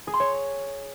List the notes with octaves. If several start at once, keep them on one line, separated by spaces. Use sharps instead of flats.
G#4
C6
C#5